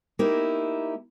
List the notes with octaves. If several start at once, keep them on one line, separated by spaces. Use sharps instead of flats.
A#3 D#4 E4 G4